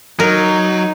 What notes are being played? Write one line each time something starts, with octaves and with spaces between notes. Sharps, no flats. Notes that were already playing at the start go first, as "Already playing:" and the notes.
F#3 D#4 A#4